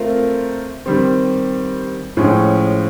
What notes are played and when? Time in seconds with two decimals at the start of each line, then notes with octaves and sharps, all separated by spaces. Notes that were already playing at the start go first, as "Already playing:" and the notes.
Already playing: A3 C4 F4 A#4
0.86 D#3 G3 C4
2.17 A2 F3 G#3 C#4